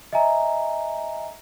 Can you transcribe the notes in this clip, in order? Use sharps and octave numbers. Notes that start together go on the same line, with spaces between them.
D#5 E5 G#5 A#5